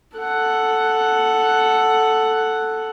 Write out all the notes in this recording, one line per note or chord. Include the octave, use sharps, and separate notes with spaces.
A4 F#5